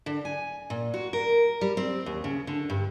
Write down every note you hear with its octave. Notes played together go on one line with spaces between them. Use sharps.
D3
G#5
A#2
F#4
A#4
G3
C4
D#2
C#3
D3
G2